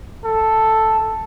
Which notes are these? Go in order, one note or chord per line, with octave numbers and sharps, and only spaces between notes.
A4